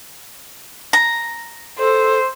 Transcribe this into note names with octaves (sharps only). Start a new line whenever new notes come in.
A#5
A4 C5